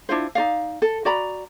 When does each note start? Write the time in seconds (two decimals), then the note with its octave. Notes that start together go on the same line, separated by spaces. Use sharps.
0.09 D4 E4 F4 C5
0.35 D#4 F4 D5 F5
0.82 A4
1.05 F#4 D5 A#5 B5